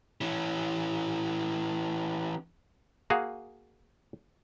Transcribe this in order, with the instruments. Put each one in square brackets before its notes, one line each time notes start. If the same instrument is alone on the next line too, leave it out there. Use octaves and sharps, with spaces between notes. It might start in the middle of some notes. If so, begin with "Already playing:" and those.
[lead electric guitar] E3 C#4
[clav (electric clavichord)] A#3 F#4 G#4 F5